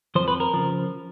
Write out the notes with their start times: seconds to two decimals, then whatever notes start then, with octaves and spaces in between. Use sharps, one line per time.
0.15 F2 C#3 F3 C5
0.28 B4
0.40 A#4
0.54 C#3 F3